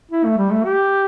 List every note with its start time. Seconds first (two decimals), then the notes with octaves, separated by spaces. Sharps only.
0.11 E4
0.25 A3
0.38 G3
0.52 A3
0.65 G4